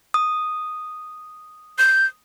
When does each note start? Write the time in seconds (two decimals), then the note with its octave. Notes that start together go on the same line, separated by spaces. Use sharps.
0.14 D#6
1.78 G6